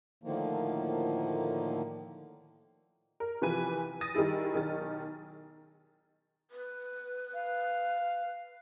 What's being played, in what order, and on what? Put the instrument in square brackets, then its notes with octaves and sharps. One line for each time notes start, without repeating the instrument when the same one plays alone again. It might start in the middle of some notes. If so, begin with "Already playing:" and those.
[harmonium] A2 D3 D#3 F3 A#3
[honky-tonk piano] A#4
C3 E3 F3 B4 G#5 D#7
D#6 A6 A#6 D#7
D#3 G3 E4 G#4
B1 D#3 A6
[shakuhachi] B4
[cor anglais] F5